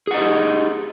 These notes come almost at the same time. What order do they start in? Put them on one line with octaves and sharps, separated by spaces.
G#4 F#5 D#5 G4 D#4